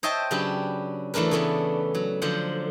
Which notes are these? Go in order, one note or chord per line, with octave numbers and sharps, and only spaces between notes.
C5 C#5 D#5 E5 G5 A5
C#3 F#3 D4 G4 B4
E3 A3 D4 A#4 B4
C#3 E3 A3 B3 D4
F#3
D3 F3 F#3 C5 F#5